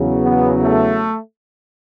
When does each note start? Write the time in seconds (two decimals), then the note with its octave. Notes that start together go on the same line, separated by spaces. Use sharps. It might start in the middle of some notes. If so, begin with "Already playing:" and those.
Already playing: E2 C#3 F#3
0.23 B3
0.63 A3